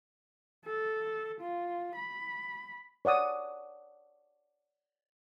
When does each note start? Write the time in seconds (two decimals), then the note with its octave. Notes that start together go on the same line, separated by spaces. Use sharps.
0.66 A4
1.41 F4
1.96 B5
3.05 C#5 D5 F#5 D#6